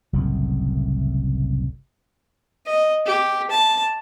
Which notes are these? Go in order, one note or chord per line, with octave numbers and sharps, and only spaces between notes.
F#1 C2 F#2 A2
D#5
G4
A5